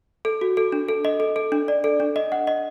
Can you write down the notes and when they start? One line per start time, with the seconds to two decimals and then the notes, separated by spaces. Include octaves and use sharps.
0.25 A4
0.41 F#4
0.57 A4
0.72 D4
0.88 A4
1.05 D#5
1.20 A4
1.36 A4
1.52 D4
1.68 D5
1.84 A4
2.00 D4
2.16 D#5
2.32 F#5
2.47 D#5